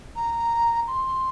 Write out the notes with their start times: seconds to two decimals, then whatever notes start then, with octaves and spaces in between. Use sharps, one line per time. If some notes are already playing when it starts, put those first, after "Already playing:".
0.16 A#5
0.88 C6